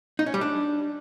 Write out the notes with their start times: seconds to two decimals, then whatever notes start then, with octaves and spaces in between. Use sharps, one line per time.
0.19 D#4
0.26 C#4
0.34 G3
0.41 D4